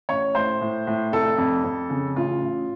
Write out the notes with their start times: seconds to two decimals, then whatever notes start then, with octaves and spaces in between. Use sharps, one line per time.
0.09 A1 C#5
0.35 A2 C5
0.61 A2
0.87 A2
1.13 F1 A4
1.38 F2
1.64 F2
1.90 C#3
2.16 A1 F4
2.42 A1